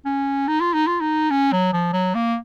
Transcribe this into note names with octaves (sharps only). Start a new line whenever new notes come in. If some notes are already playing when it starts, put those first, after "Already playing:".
C#4
D#4
F4
D#4
F4
D#4
C#4
F#3
F3
F#3
A#3